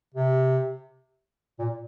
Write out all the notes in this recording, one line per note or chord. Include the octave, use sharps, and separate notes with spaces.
C3
A#2